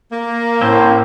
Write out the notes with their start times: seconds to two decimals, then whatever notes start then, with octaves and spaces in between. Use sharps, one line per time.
0.12 A#3
0.61 A2 C4 C#4 C5